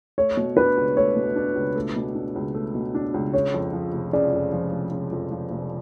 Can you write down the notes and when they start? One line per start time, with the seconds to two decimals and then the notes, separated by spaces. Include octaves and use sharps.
0.18 A3 C#5
0.37 B2
0.57 D4 B4
0.77 C#2
0.97 A3 C#5
1.16 B2
1.36 D4
1.55 C#2
1.76 A3
1.96 B2
2.15 D4
2.35 C#2
2.55 A3
2.75 B2
2.95 D4
3.14 C#2
3.34 C#3 C#5
3.54 F2
3.73 F3
3.93 F1
4.13 C#3 D5
4.33 F2
4.52 F3
4.72 F1
4.92 C#3
5.12 F2
5.31 F3
5.51 F1